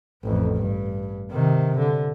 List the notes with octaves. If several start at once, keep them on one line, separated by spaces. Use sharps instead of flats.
A1 F2
G2
C3 D#3
D3